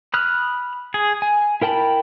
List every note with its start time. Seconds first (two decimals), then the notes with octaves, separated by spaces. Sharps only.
0.14 B5 D#6 F6 F#6
0.94 G#4
1.22 G#5
1.62 E4 A#4 G5 A5 B5